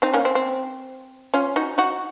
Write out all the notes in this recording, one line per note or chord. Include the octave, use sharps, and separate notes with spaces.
C4 D#4
A#3 C#4
C4
C4
C#4 F4
D#4 F#4
D#4 F#4